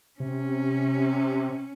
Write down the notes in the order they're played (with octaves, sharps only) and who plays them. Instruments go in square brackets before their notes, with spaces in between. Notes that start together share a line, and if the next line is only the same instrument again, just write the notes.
[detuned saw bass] C3 [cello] C#4